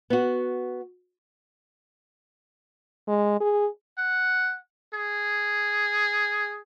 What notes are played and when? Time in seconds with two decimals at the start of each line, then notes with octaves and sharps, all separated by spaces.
0.10 B3 F#4
3.08 G#3
3.41 G#4
3.98 F#5
4.94 G#4